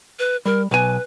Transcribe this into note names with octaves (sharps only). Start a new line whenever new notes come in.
B4
G3 A#4
B1 B4 G#5